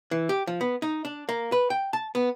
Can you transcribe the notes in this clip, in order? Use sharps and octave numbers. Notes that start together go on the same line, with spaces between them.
E3
G4
F3
B3
D#4
D4
A#3
B4
G5
A5
B3